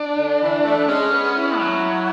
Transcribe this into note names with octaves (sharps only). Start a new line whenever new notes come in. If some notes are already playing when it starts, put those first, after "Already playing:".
Already playing: D4
D3
E3
A3
G#3 C#4
B3
E4
F#3